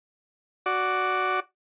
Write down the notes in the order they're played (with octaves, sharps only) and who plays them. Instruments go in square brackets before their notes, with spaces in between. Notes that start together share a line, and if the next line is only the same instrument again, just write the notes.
[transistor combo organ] F#4 D5